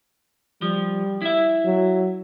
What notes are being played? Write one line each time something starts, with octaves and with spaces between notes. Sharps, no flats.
F3 G3
E4 E5
F#3